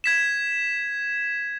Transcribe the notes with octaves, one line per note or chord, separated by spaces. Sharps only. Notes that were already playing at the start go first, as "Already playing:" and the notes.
G#6 B6 E7